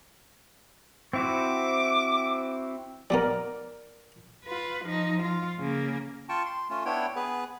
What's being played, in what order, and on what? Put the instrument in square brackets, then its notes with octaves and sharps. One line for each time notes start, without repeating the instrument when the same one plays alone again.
[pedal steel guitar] C4 E4 F#4 [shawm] D6
[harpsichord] G3 B3 C#4 [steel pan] A#4 D5
[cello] F4 B4
F3 D#4
F4
C#3 A#3
[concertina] F4 G5 A5 C#6
C6
A3 C#4 F4
B3 D4 E4 C#5 G5
B3 G#4 B4